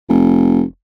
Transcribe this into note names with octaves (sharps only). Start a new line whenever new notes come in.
F1